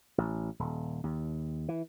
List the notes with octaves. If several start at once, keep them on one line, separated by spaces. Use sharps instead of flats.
A1
D#1
D#2
E3